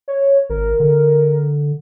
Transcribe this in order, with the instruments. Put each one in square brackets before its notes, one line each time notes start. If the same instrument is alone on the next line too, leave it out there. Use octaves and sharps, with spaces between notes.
[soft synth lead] C#5
[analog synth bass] G#1 [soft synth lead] A#4
[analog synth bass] D3